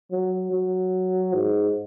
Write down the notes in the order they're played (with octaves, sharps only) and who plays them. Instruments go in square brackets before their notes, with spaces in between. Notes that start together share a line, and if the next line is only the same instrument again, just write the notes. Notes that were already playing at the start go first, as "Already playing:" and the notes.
[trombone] F#3
F#3
G#2